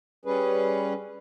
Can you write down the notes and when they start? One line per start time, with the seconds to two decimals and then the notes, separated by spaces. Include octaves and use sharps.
0.25 G3 C#4 G#4 B4